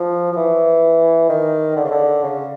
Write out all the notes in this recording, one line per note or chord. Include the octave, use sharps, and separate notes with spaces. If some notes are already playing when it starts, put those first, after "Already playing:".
Already playing: F3
F3
E3
D#3
D3
C#3
D3
C#3